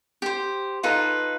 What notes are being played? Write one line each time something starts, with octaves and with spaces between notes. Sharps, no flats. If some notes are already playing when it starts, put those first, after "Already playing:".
G4 C5
D#4 F4 A4 B4